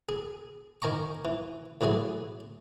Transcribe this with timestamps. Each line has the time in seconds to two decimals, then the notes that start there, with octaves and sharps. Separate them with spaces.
0.09 G#4
0.82 D#3 G#5 A#5 C#6
1.25 E3
1.81 A2 E3 F#3 G#4 G#5